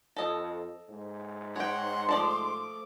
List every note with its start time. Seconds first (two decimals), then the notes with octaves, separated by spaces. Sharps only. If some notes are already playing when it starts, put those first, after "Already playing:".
0.16 F2 A4 D#5
0.89 G#2
1.56 C#5 F#5 G5 C6
2.09 F3 A3 D5 A5 D6